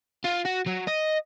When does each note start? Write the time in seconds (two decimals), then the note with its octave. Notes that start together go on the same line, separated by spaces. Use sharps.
0.24 F4
0.45 F#4
0.66 F#3
0.87 D#5